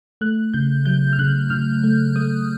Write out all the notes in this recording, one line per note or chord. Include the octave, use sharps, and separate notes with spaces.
A3 F#6
C#3 G6
F#3 G6
F6
C#3 F#6
C#3 F6
A3
A3 D#6